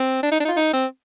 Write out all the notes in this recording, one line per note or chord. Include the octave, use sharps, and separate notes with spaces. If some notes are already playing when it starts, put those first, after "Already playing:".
Already playing: C4
D4
D#4
D4
D#4
F4
D#4
C4